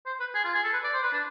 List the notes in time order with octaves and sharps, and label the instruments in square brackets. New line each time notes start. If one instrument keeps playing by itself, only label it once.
[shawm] C5
B4
G#4
F4
G#4
A4
B4
D5
C5
B4
D4